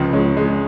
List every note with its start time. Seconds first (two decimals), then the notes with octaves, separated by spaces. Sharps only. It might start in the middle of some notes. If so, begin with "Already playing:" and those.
Already playing: C#2 C#3 F3
0.13 G#3 C#4
0.37 G#3